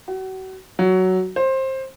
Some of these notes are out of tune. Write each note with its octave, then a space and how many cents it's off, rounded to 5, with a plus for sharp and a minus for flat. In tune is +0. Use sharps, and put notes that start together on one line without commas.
F#4 +35
F#3 +10
C5 +20